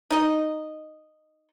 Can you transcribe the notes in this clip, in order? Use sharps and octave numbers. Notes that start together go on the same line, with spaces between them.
D#4 D#5